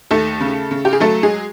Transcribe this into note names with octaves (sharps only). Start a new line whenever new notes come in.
D#2 A3 A4
C#3
C#3
G4
G#4
F#3 A3 A4
G#3 G#4